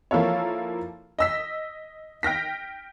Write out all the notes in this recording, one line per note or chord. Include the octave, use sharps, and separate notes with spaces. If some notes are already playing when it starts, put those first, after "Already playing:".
F3 A#3 E4 F4 A4 C#5
D#5 E6 B6
G5 F6 A#6 B6